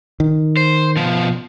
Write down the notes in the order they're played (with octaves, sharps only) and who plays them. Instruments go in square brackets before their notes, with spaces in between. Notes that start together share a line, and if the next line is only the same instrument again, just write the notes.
[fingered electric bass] D#3
[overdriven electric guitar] C5
B2 F3